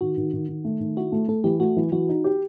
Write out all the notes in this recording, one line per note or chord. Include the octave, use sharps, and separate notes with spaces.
D#3 F#4
D#3
D#3
D#3
A3
D#3
E4 F#4
A3
A3 A4
E3 G4
A3 F#4
E3
E3 F#4
D#4
G4